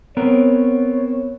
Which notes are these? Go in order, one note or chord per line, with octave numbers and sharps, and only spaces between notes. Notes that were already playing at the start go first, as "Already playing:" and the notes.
B3 C4 A#4 C#5